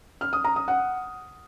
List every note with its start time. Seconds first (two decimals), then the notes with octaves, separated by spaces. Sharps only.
0.21 F6
0.33 D#6
0.44 A#5
0.56 D#6
0.68 F#5